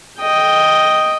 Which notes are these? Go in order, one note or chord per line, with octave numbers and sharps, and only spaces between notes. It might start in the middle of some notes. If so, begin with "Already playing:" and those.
D#5 G5